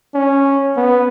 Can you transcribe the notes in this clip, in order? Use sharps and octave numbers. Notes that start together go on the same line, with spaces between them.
C#4
B3